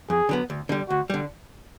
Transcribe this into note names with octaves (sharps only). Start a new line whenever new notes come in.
F2 G#4
D3 F#3 B3
D2
D3 G3
D2 F#4
D3 G3